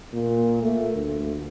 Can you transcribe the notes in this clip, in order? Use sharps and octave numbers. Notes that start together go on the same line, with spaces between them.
A#2
A3
D2